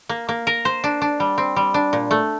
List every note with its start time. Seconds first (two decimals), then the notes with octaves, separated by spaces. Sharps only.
0.09 A#3
0.29 A#3
0.47 A#4
0.65 C5
0.84 D4
1.02 D4
1.20 G3
1.38 C4
1.56 G3
1.74 D4
1.93 A#2
2.11 A3